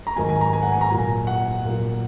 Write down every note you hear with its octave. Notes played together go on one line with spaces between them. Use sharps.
A#5
G#2 D#3 F#3 G#5
G#5
A#5
G#5
F#5
G#5
A#5
A#2 F#3 G#5
F#5
A#2 F#3